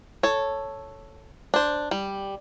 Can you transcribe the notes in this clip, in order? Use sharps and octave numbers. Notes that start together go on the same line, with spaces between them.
A4 C#5
D4 C5
G3